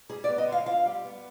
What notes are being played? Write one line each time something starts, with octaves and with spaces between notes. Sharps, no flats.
G3 G#4
D5
B3
D#5
D3
F5
F4 F5
G3
B3